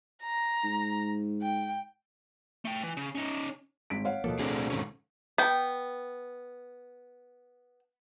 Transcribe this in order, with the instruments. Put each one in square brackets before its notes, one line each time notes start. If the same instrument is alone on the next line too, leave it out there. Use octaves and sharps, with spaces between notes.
[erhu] A#5
[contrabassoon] G#2
[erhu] G5
[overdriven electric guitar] A3 G5
E3
C#3
C#4 D#4
[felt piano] G#1 B6 D7
C#5 F5 F#5
[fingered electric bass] D#2 F3 A#3 [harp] B2 A4
[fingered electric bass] D2 A3 C4 [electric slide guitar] A2 D4 G#4
[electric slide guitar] G#2 D#3 C#4
[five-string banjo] B3 G5